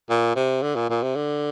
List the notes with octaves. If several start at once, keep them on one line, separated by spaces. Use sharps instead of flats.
A#2
C3
D3
A#2
A#2
C3
D3